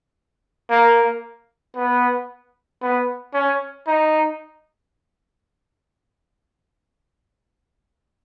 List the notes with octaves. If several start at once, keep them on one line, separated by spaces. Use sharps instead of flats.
A#3
B3
B3
C#4
D#4